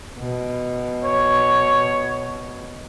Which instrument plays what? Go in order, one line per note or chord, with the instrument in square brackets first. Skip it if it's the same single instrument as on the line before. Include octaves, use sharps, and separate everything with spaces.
[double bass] B2
[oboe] C#5